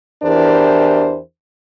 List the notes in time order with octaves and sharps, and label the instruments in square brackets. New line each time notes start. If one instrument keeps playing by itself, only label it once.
[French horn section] E2 E3 D4 G4 A#4 C5